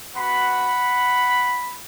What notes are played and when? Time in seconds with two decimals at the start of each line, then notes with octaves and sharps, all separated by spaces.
0.16 B3 F#4 F#5 B5